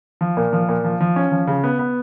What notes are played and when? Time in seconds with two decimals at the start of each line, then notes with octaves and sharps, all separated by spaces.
0.21 F3
0.37 A#2
0.53 F3
0.69 A#2
0.84 F3
1.00 F3
1.16 C#4
1.32 F3
1.47 C#3
1.64 B3
1.79 B3